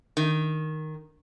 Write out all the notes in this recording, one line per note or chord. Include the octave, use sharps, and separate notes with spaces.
D#3